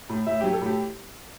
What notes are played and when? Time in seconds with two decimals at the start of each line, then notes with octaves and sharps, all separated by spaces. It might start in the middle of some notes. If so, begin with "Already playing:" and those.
0.10 A2
0.26 A2 E5
0.41 F#3 G4
0.53 A4
0.61 A2 G4